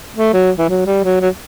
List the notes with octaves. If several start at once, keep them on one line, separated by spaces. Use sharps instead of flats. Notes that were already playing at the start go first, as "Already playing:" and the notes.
A3
F#3
E3
F#3
G3
F#3
F#3